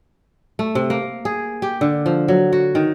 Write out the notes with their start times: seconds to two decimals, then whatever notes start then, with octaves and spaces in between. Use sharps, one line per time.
0.59 A3
0.75 C3
0.90 A#3
1.25 G#4
1.62 G4
1.81 D3
2.06 F3
2.28 F#3
2.53 F#4
2.75 D#3